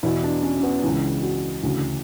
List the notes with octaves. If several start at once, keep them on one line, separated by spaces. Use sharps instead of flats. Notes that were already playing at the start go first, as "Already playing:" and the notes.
E2 B2 E4
D4
C#4
C#4
B3
C#2 C#3 E3 C#4
F#4
D2 C#3 E3 F#4